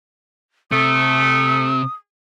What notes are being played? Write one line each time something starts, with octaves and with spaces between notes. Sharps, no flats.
C3 A3 D#6